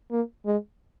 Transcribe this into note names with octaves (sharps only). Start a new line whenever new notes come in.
A#3
G#3